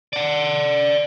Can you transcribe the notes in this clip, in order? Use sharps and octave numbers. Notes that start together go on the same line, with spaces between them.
D5 F#5